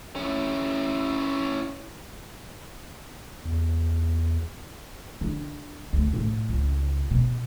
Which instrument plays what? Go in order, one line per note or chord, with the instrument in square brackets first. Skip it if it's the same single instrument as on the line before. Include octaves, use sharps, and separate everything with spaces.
[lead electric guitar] C#4 E4
[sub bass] E2
[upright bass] D3
D2
A2
C#2
B2